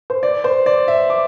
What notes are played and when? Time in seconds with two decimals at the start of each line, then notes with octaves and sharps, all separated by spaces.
0.10 C5
0.23 D5
0.44 C5
0.66 D5
0.88 E5
1.10 D6